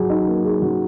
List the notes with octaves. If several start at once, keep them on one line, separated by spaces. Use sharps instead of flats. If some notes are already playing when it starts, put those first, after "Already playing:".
Already playing: F#3 G#4
D#4
A#3
G#4
F#3